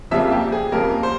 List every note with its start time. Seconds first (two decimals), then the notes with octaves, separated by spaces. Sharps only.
0.11 F2 C#3 G3 A#3 E5
0.32 G4
0.52 G#4
0.72 F2 C#3 G3 A#3 A#4
1.03 C5